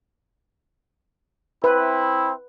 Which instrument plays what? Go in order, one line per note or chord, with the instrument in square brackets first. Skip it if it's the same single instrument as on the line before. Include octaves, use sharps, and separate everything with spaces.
[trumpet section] C4 E4 [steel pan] B4